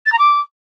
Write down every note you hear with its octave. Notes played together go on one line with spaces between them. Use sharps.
A6
A#5
D6